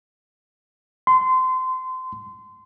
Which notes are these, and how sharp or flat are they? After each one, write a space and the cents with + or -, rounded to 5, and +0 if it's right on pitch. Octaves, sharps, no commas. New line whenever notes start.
C6 -25